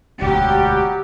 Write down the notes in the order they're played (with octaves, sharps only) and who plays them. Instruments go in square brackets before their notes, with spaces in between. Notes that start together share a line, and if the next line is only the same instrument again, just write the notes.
[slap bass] E1 D2 [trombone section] F#3 G3 [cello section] G4